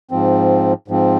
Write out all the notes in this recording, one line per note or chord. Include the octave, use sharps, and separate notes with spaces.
G#2 F3 C4
G#2 F3 C4